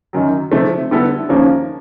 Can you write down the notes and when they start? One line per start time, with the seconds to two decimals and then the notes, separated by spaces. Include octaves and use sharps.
0.13 F#2 D#3 F#3
0.52 C3 F3 A3
0.91 D3 G3 B3 E4 A4
1.29 D#2 C#3 F3 A#3 C#4